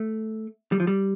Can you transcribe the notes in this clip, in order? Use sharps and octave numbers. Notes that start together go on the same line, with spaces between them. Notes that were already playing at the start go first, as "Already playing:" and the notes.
Already playing: A3
G3
F3
G3